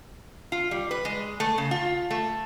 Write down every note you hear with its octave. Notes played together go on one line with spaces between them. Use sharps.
F4
G3
B4
G#3
A3
C#3
F4
A3